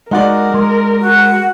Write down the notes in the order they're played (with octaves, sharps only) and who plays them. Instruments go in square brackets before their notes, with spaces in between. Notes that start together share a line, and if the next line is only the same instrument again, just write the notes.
[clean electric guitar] G#3 F#5 [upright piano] D#4 F#4 D5 [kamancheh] A#4
[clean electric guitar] G#3
[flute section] F#4